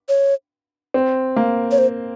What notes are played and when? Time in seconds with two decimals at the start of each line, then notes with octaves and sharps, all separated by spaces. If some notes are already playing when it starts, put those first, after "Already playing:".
0.09 C#5
0.94 C4
1.36 A#3
1.71 C#5
1.78 C5